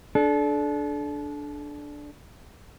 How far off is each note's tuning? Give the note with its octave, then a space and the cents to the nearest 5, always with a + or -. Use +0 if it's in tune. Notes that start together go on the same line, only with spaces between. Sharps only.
D4 +0 A4 -35